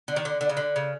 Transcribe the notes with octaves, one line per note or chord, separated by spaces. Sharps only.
D3
D#3
D3
D3
C#3
D3
C#3